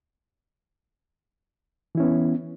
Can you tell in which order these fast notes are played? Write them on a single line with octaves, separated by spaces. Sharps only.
E3 E4 C#4 B3